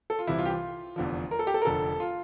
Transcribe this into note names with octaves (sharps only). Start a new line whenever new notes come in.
A4
F4
C2 C3 E3 E4
F4
G4
F4
F1 E2 D3 F3
A#4
A4
G4
A4
A#4
F1 F2 D3 A4
F4